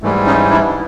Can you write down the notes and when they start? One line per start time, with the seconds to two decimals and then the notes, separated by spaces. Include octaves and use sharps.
0.02 G#2 E3 G3 A3
0.26 C#4 D#4
0.50 D4 E4